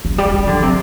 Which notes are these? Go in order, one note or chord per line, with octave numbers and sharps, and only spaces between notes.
F#3
G3
F#3
D3
C3